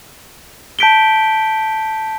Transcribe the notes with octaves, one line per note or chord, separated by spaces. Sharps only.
A5 G6 B6 D7 G7